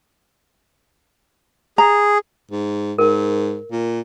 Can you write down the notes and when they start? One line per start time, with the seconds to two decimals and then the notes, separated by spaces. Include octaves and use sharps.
1.78 G#4 A#5
2.51 G#2
2.98 G#2 A#4
3.71 A#2